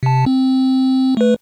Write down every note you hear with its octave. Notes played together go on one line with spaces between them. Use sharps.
C3 A5
C4
A3 B4